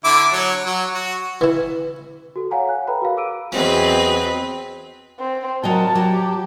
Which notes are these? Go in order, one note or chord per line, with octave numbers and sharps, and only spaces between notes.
D3 E4 D6
F#3 C#5
F#3
F#4
E3 E4
F#4 A4
C#5 F5 F#5 G#5 A#5
F#6
A4 B4 E5 G5 A#5 B5
F#4 G#4 A#4 F5
D6 E6 D7 D#7
E2 F#3 C4 C#4 B4 D#5
C4
F#3 A#4 D#5 G5 A5
F#3 G4